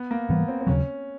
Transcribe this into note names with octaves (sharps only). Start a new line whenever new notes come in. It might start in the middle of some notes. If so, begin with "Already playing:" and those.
Already playing: B3
A#3
G#2 E3 G3 B3
C4
C4
D#2 C#3 F#3 C#4